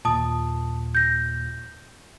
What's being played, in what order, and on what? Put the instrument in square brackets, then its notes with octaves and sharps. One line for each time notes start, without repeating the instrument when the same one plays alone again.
[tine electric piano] D#2 A#2 [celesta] A5 D#6
[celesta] G6 A#6